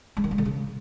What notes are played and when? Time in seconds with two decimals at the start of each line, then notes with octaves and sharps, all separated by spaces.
0.17 G#3
0.24 D#3
0.31 G#3
0.38 D3
0.45 C#3